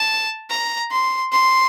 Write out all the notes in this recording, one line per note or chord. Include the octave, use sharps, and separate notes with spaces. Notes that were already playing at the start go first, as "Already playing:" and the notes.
Already playing: A5
A#5
C6
C6